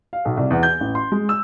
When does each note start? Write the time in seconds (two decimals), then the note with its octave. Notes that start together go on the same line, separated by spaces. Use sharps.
0.13 F5
0.25 B1
0.37 C2
0.50 E2
0.63 G6
0.80 A1
0.95 C6
1.12 G#3
1.29 E6